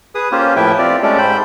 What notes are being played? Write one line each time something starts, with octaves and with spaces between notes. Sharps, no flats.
G#4 B4 D#6
A#3 C#4 F4 G4 C5
A2 F3 E4 B4 E5 G5
C4 F4 G4 D5
G#3 A3 C#4 G4 A4 D5
G#2 C5 G5 B5